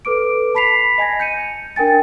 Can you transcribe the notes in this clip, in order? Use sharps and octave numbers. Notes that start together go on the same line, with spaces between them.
A4 B4 D6 D7
A5 B5 B6 C7 F7
D#5 G#5 G#6 A#6
G6 C#7 D#7
D4 A#4 G5 G#5 A6